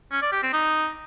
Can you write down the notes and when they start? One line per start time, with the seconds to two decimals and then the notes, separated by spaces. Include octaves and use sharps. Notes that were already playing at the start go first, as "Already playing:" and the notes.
0.12 C#4
0.22 D5
0.32 G4
0.43 C4
0.53 D#4